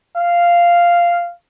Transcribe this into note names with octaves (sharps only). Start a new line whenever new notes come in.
F5